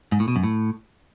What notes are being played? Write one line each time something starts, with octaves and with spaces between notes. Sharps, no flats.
G#2
A2
B2
F#2
A2